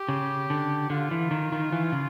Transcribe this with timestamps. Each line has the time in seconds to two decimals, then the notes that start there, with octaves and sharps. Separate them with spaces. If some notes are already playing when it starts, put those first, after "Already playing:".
Already playing: G4
0.08 C#3
0.50 D3
0.90 D3 F4
1.11 E3
1.31 D#3
1.52 D#3
1.72 E3
1.92 C#3